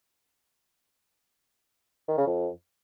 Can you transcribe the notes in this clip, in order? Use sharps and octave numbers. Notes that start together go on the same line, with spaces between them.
D#3
C#3
F2